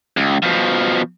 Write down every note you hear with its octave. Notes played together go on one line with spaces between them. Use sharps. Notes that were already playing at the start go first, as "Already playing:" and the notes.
C#2
B2 F3